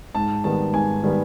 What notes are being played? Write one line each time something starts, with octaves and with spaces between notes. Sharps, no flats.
G#2 A5
D#3 G3 B3 A5
G#2 G#5
D#3 G3 B3